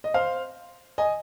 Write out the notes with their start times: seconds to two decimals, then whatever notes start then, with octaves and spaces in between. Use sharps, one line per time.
0.04 D#5
0.14 C5 F5
0.98 D#5 G#5